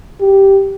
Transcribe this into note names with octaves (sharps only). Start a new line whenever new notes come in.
G4